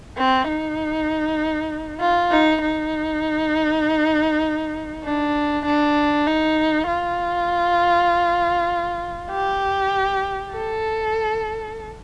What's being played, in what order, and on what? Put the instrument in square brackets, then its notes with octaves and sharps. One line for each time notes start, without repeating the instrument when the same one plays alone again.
[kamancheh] C4
D#4
F4
D#4
D#4
D4
D4
D#4
F4
G4
A4